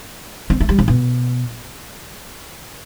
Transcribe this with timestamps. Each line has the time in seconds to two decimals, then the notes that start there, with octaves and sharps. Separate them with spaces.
0.50 C4
0.60 A3
0.69 G3
0.79 C3
0.88 B2